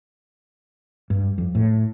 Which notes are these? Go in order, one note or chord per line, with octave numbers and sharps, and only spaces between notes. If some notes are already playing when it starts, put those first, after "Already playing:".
G2
F2
A2